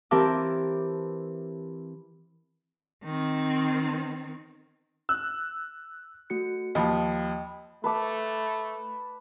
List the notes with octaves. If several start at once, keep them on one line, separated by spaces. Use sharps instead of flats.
E3 C4 G4 A#4 A5 D6
D#3 C4
E6 F#6
A3 F#4 C#7
D#2 F3 D#5 G5 B5
A3 B4 A5 D6